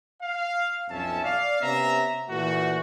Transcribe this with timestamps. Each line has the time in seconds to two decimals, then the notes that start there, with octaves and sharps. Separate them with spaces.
0.23 F5
0.90 B1 F2 C4 C#4 E5 A5
1.23 D5 F5
1.62 C3 B3 C#4 E5 A#5
2.30 A#2 E3 A3 F#4